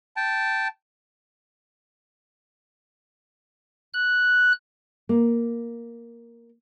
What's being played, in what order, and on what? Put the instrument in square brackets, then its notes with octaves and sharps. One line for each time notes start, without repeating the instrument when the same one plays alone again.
[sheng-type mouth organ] G5 A5
[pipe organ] F#6
[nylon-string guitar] A#3